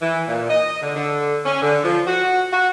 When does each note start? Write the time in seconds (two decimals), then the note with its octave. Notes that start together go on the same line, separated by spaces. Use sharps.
0.01 E3
0.27 A#2
0.48 D#5
0.82 D3
0.96 D3
1.44 C#4
1.62 D3
1.84 F3
2.06 F#4
2.52 F#4